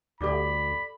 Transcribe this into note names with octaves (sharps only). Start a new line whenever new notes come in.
D2 G2 G4 A4 D5 B5 D6